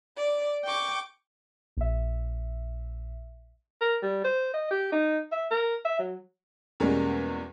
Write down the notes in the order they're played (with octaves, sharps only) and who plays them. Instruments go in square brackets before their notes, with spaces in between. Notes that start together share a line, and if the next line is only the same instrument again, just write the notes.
[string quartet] D5
G5 C#6 D6
[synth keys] A#1 E5
[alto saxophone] A#4
G3
C5
D#5
G4
D#4
E5
A#4
E5
F#3
[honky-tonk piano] E2 B2 G3 G#3 A#3 C#4